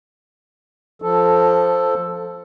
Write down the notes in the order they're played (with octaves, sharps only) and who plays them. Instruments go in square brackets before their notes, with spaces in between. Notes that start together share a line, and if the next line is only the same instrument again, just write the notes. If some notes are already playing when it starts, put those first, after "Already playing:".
[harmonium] F3 A4